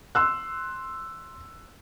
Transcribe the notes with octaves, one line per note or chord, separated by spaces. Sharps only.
C6 E6 F#6